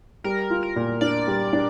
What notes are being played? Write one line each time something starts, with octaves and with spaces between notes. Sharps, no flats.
G3 A#4
F4
A#4
A#2
D4 D5
G3
D4